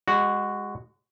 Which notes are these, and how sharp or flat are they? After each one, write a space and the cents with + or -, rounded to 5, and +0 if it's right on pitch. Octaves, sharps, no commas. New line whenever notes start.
G#3 -25 F#4 +0